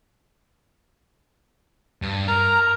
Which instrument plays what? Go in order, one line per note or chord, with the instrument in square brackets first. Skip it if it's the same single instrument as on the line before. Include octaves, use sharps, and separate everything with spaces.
[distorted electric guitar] G2
[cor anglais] A#4 [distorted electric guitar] A#5